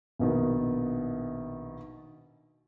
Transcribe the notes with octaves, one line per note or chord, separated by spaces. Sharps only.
A#1 B2 D#3